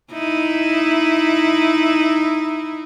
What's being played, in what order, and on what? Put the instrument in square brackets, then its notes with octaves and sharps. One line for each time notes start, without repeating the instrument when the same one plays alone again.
[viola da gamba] D#4 E4